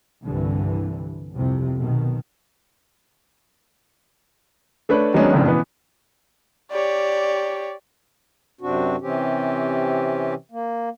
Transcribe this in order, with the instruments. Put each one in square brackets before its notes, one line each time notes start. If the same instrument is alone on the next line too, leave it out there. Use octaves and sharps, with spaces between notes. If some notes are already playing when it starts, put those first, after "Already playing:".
[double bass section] C2 G2 D3 E3
C2 F2 C3
B1 B2 D#3
[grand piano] A3 D4 B4 C#5
D#3 F#3 G#3 B3 C#4 D4
F#1 F2 A2 C#3 D4
B2 E3 B3
[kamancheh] G4 C#5 [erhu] D5
[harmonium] F#2 C3 C4 D4 F#4
C3 E3 C4 C#4 G4
A#3